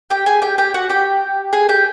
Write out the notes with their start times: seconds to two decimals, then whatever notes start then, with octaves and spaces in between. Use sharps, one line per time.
0.10 G4 G5
0.26 G#4 G#5
0.42 G4 G5
0.58 G4 G5
0.74 F#4 F#5
0.89 G4 G5
1.53 G#4 G#5
1.69 G4 G5